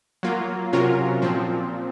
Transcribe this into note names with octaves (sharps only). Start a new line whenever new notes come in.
F#3 A#3 F4
C3 F#3 C#4 F4 A#4
A#2 F3 C4